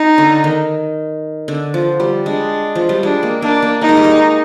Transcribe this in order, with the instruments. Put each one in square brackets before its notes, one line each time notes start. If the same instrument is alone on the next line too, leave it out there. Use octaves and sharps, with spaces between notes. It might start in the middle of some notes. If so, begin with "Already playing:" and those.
Already playing: [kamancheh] D#4
[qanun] D3
D#3
D3
F3
G3
[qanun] G#3 [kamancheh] D4
[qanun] F3
G3
[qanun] G#3 [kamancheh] D4
[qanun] A#3
[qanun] A#3 [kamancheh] D4
[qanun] A#3
[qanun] A#3 [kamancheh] D#4
[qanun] G#3
G3
G#3